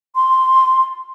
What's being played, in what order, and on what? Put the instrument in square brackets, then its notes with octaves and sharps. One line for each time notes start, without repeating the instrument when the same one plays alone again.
[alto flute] C6